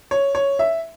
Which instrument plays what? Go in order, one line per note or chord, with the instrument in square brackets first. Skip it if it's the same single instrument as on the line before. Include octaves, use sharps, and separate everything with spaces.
[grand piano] C#5
C#5
E5